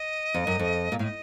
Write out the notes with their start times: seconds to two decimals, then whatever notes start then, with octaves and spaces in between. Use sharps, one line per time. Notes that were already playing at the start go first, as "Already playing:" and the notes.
Already playing: D#5
0.34 F2
0.47 F#2
0.59 F2
0.92 A#2
0.99 A2 F5
1.04 D#5